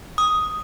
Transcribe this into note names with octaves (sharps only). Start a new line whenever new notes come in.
D#6